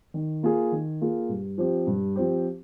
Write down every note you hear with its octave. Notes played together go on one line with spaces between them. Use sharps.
D#3
A#3 F4 G#4
D#3
A#3 F4 G#4
G2
F3 C4 G4
G2
F3 C4 G4